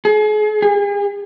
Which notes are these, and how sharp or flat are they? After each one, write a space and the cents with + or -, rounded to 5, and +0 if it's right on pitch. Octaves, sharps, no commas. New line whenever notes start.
G#4 +40
G#4 -40